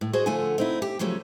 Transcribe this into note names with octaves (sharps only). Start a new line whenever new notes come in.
A2
F#4 G#4 C5 D#5
D3 F3 A3 F4 F#5 G#5
C4 D#4 E4
G4
C#3 F3 F#3 A3 C#4